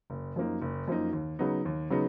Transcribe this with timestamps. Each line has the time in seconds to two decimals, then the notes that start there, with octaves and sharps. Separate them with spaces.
0.10 F#1
0.36 F#2 F3 A#3 D#4
0.61 F#1
0.88 F#2 F3 A#3 D#4
1.13 D#2
1.39 C#3 F#3 B3 D#4
1.65 D#2
1.90 C#3 F#3 B3 D#4